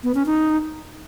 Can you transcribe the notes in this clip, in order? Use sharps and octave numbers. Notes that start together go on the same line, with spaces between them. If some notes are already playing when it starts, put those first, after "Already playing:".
B3
C#4
D#4